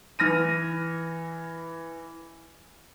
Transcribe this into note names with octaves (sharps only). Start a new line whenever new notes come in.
E3 F6 A#6 D#7